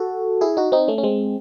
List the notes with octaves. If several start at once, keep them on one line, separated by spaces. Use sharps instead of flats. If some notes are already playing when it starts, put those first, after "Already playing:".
Already playing: F#4 A4
E4 G#4
D#4 F#4
C4 D#4
A3 C#4
C#4
G#3 C4